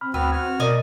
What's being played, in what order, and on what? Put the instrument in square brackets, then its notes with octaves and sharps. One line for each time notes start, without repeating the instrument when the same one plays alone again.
[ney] C4 [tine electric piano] B5 F6
[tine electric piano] D2 G5 E6 [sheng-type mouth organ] B3 F#4 F6 [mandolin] B4
[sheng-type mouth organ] F#4 F6 [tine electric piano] G#6
[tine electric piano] B2 [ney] A#4 [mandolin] D5 D#5 C#6